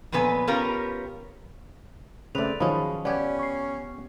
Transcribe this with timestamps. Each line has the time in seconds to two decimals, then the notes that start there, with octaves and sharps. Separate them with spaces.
0.12 F2 A#2 B3 B4 G#5
0.47 B3 C#4 F4 G4 A#4
2.35 C#3 A3 C4 B4 D5 F7
2.60 D#3 F3 F#3 G#3 C#4 B5 D#6
3.05 B3 C#4 G4 D5 G#6
3.39 C#6 C7